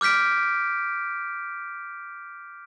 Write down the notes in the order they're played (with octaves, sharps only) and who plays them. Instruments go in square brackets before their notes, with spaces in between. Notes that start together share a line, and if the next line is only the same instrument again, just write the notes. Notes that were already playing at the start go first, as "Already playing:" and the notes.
[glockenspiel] D6 F6 G6 B6 D7